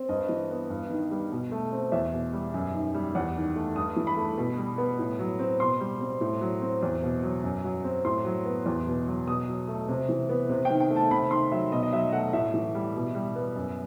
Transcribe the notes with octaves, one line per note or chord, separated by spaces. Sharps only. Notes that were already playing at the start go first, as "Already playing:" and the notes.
Already playing: C4
G2 D#5
E3
B3
G2
D#3
G3
B2
A3
C4
E2 E5
B2
G3
F#2
D#3
G3
E2 F#5
D#3
A3
G2 D#6
E3
B5
A3
B2
G3
B3
A2
F#3
C4
B2 C6
G3
C4
A2
F#3
C4
E2
B2
F#3
F#2
F#3
C4
A2 C6
F#3
B3
E2
B2
F#3
B2 D#6
F#3
A3
C3
E3
B3
C3
G5
D#3
G5
A3
A5
C3 B5
D#3 C6
F#3 E5
B2 D#5
D#5
F#3 E5
A3 F#5
A2 E5
E3
G3
B2
G3
B3
F#2